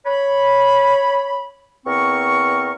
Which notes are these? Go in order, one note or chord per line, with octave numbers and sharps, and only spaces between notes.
C#5 B5
E2 C4 A#4 C#6